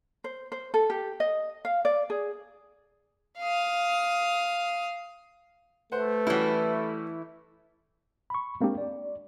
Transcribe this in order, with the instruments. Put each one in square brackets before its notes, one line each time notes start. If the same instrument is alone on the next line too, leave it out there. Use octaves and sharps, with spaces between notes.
[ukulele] C5
C5
A4
G4
D#5
F5
D5
G#4
[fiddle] F5 D#6
[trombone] A3 [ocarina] B4 [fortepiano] C5 F#5
[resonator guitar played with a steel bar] E3 E4 [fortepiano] G3 C#4 F#4
[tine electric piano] B5 C#6
G#3 A#3 C4 D4 G4
D5